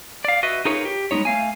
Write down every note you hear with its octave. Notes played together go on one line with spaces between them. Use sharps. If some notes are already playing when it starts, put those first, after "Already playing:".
D5 F5
F#4 B4 D#5 E5
D#4 F4 G#4 A#4 B4 C#5
G4
G3 G#3 B3 D#4 C#5
A3 F5 G#5